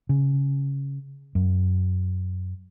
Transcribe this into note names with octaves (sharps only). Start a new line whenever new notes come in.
C#3
F#2